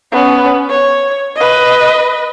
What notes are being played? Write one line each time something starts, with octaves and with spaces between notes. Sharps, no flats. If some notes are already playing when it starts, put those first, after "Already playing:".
B3 C#4
C#5
B4 D#5